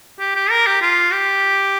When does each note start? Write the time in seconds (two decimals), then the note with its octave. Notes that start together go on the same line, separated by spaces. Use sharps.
0.20 G4
0.35 G4
0.51 A#4
0.67 G4
0.82 F4
1.12 G4